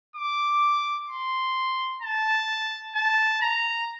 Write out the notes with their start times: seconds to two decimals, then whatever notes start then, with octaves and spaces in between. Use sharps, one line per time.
0.16 D6
1.09 C6
2.02 A5
2.95 A5
3.41 A#5